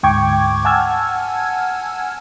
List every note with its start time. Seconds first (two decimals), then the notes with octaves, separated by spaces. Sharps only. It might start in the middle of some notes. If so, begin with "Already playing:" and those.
0.03 D2 G#2 G5 C#6 D6 G#6
0.65 F#5 G#5 A5 E6 F6 G#6